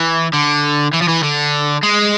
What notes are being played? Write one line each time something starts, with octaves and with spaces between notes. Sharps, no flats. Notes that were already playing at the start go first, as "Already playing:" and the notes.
Already playing: E3
D3
E3
F3
E3
D3
G#3